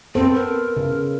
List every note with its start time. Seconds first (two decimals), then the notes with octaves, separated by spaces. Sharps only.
0.15 B3 C4 A4 C5
0.35 A#4
0.77 C#3